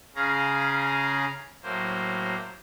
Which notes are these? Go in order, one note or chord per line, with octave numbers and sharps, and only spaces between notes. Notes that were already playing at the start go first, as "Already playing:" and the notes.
C#3 C#4 G#4 F5 A#5
A2 F#3 A#3 C5